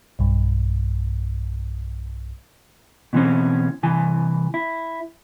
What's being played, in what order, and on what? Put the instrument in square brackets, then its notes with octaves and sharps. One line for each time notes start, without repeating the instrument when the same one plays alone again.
[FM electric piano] B1 G2
[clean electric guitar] B2 E3 C4 C#4
C2 E3 G#5
E4